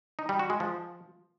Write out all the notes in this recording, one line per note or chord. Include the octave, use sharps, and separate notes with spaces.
D#4
G3
F#4
G#3
F3